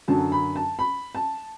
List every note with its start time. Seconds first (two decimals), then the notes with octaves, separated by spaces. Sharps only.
0.08 F#2 D3 F#3 A5
0.32 B5
0.56 A5
0.79 B5
1.15 A5